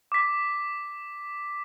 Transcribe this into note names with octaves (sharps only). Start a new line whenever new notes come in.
D6 B6